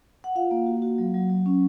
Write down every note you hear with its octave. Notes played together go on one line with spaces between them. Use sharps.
F#5
F4 F5
A#3
F#4
F#4
F#3
F#3
F#3
C#4